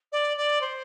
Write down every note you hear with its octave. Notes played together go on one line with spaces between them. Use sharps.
D5
D5
C5